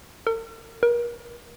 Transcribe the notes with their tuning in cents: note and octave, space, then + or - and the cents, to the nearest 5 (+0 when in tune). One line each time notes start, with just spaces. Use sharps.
A#4 -45
A#4 +35